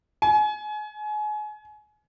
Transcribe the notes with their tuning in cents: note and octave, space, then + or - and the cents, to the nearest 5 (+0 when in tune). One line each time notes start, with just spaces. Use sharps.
G#5 +30